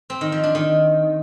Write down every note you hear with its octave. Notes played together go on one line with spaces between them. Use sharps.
C4
D#3
F3
D4
D#3